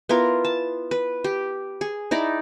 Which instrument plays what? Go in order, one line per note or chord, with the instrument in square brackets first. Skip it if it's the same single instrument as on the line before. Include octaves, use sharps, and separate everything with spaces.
[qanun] B3 E4 F4 A#4
A5
B4
G4
G#4
D#4 E4 D5